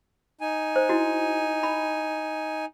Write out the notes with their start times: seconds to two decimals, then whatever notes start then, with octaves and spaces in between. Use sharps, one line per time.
0.41 D#4 G#5
0.76 C5
0.89 E4 F#4
1.63 B5